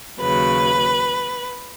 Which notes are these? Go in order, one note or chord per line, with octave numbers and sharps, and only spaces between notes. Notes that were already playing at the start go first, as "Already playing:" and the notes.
D#2 C#3 F#3 B4